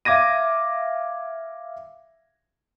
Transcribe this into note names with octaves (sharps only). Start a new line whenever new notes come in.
E5 F5 D6 G#6 A#6 D#7